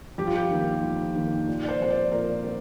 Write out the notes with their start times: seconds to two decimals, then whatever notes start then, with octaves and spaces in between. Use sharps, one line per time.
0.18 F2 G4
0.27 F4
0.35 G4
0.50 D#3 A#3
0.83 F2
1.15 D#3 A#3
1.47 A#2
1.63 D5
1.69 C5
1.80 F3 C4 C5
1.90 D5
2.12 A#2 A#4
2.44 C4